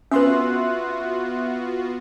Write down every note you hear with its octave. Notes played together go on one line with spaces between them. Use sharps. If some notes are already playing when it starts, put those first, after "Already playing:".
B3 C#4 F4 F#4 B4 E5 C6 F#6